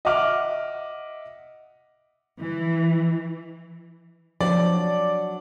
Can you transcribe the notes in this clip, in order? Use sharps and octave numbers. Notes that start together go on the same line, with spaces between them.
D#5 E5 F#5 D6 F6
E3
F3 F#3 D4 D5